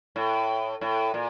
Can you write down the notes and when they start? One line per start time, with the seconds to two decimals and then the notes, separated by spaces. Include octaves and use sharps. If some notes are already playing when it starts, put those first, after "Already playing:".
0.16 A2
0.81 A2
1.14 A#2